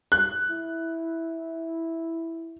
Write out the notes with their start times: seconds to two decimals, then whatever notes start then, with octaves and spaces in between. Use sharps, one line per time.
0.12 F#6
0.50 E4